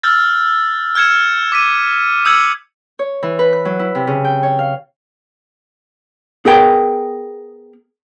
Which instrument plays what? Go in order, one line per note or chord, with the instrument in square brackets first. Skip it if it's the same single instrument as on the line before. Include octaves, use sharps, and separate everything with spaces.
[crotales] E6 F6 G6 A6
F6 G6 G#6 C#7 E7
D6 B6 D#7
D#6 E6 G6 G#6 C#7 F#7
[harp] C#5
E3
B4
F#6
F#3
E4
C3
C#3
G5
C#5
F5
[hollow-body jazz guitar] B3 G#4 A#4 G5